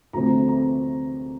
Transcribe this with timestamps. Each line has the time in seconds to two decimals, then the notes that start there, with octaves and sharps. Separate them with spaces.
0.13 D2 C3 F3 A3 C4 A#5
0.48 A#5